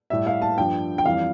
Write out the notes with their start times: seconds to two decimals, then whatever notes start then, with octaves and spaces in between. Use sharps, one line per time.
0.10 A2 G3 E5
0.26 F5
0.42 A5
0.58 G2 F3 G5
0.98 G5
1.05 F2 E3 G3 F5